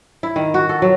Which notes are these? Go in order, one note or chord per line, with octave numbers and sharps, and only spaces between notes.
E4
D#3
F#4
A4
F#3